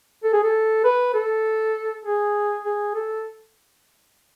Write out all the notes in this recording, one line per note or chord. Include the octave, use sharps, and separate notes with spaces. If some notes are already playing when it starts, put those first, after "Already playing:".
A4
G#4
A4
B4
A4
G#4
G#4
A4